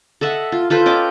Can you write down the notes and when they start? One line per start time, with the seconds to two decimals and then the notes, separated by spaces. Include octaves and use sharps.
0.21 A4 D#5 E5 F#5
0.52 F4
0.70 F4 A4 B4 C5
0.86 C#4 D#5 G5 D6